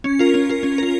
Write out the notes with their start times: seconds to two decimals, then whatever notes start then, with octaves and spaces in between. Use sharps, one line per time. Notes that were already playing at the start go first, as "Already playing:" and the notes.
0.04 C#4
0.19 F4 A#4
0.34 C#4
0.49 F4 A#4
0.63 C#4
0.78 F4 A#4